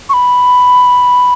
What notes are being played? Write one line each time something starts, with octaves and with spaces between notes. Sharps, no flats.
C#6
B5